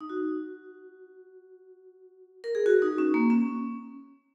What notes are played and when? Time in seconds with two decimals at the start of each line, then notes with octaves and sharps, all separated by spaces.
0.01 D#4
0.10 F#4
2.44 A#4
2.55 G#4
2.66 F#4
2.82 D#4
2.98 C#4
3.14 A#3
3.30 C#4